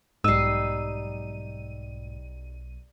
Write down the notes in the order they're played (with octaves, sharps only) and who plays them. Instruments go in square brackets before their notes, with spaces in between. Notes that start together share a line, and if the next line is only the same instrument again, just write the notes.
[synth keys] B1 D#7 [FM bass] G#2 [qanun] G3 D#4 [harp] E6 C7